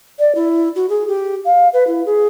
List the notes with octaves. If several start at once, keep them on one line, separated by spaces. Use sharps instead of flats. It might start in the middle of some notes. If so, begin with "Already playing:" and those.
D5
E4
F#4
G#4
G4
F5
B4
E4
G#4